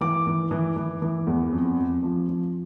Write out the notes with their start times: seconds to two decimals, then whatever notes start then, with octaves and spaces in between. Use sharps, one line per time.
0.01 E3 D6
0.27 E3
0.51 E3
0.76 E3
1.02 E3
1.27 E2
1.53 F2
1.79 F2
2.03 F3
2.29 F3